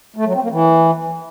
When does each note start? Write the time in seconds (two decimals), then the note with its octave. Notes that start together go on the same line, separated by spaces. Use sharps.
0.16 A3
0.25 F#3
0.34 C4
0.43 A#3
0.51 E3